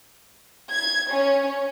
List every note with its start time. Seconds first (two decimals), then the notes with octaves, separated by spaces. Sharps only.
0.71 G#6
1.11 C#4